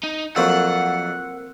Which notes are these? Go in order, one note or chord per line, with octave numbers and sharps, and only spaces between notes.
D#4
F2 F3 F#3 A#3 C4 F#5 E6